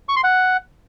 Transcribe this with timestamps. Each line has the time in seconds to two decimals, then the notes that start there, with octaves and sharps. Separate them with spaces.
0.09 C#6
0.16 C6
0.24 F#5